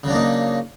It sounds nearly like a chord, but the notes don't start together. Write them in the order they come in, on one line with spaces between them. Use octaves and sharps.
C#3 F#3 D4 A#3 D#4